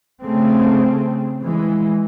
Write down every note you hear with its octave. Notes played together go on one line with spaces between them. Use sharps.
C#3 A3 C4
E3 G#3